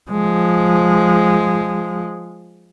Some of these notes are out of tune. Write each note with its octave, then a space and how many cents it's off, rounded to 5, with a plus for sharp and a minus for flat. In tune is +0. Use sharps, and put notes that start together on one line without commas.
F3 +0 G#3 +0